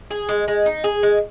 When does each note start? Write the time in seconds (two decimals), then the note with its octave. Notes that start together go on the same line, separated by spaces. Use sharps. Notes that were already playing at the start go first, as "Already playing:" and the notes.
0.11 G#4
0.29 G#3
0.48 G#3
0.66 D#4
0.84 G#4
1.03 G#3